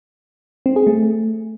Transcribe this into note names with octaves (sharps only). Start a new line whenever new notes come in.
C4
G#4
A3